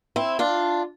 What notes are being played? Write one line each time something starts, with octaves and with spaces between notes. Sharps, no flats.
C4 E4
D4 F4